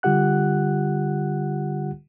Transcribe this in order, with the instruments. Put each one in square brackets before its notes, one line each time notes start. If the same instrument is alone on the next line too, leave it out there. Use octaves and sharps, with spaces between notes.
[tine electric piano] D3 G3 F4 G4 F#5 F#6